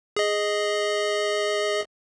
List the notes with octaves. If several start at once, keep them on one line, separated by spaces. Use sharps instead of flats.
G#4 D#5